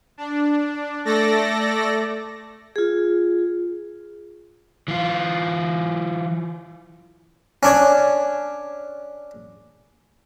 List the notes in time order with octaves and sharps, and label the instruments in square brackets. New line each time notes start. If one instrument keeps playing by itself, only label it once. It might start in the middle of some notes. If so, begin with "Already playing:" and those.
[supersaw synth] D4
A3 A4 D5 A#6
[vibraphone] F4 G#4
[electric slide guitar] E3 F4
[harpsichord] C#4 D4 C#5